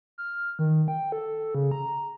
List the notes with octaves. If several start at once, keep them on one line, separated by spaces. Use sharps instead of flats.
F6
D#3
G5
A4
C#3
A#5